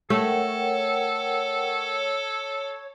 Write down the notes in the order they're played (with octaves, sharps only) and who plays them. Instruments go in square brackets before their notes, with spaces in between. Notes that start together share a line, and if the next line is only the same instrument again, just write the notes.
[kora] A3 [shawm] A4 [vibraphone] A#4 F#5 G5 [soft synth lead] C#5